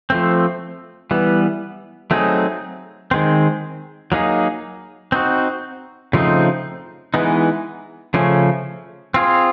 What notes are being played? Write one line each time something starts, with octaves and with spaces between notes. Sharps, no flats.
F3 A3 C4
E3 G3 B3
F#3 A3 C4 D#4 G#4
D#3 G#3 C4
F#3 A#3 D#4 G#4
C4 D#4 F#4
C#3 F3 A3 C4 D#4
E3 G#3 B3 D#4
C#3 F3 A3 C#4
C4 F4 G#4